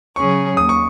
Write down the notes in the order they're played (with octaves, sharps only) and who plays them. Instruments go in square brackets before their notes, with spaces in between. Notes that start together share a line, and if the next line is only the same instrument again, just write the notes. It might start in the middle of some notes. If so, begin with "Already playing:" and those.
[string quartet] C#3 F#3 C#4 G#4 C#5 [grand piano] C#6
[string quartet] D#2 [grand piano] D#6
[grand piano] C#6